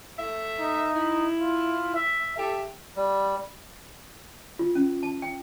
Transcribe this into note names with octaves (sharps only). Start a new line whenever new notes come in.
A3 E5
D#4
E4
F4
E5
G4 A4 E5
G3
F4
C#4
A5
G5